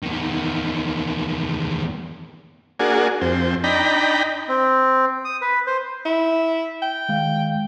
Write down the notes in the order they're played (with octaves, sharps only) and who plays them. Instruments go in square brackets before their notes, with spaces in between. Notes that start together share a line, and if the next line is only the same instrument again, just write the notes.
[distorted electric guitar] E2 D#3
[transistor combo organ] A#3 D4 F#4 G#4
F2 C4
D4 D#4 G5 A#5 B5
[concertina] C4
D#6
B4
C5
[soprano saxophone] E4
G5
[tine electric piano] D#3 G#3 F5